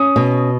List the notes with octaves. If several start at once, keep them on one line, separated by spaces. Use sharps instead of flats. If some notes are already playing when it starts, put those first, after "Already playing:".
Already playing: C#4 D#6
B2